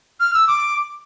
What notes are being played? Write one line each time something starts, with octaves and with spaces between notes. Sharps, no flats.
F6
E6
D6